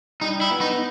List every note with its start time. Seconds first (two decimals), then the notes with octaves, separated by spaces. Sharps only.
0.21 G3 D#4
0.41 E4
0.51 B3
0.61 D#4